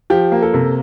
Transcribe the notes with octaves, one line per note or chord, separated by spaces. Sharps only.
F3 G4
A#3
A4
C3